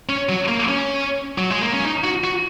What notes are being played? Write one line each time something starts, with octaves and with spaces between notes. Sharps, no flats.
C#4
F#3
A#3
C#4
F#3
G#3
A#3
C#4
D#4
F#4
F#4